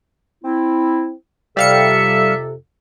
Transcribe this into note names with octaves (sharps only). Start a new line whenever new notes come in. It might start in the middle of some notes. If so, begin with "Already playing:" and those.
C4 E4
F2 C3 G3 A4 E5 F5 C#7